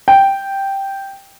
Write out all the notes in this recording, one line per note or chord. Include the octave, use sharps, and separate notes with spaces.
G5